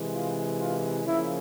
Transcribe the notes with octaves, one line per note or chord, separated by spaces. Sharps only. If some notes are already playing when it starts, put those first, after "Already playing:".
Already playing: C3 E3 G#3
F4
F4
C#3 F3 A#3 E4